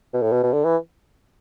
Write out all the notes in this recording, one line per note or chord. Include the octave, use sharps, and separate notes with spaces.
B2
A2
B2
B2
D3
E3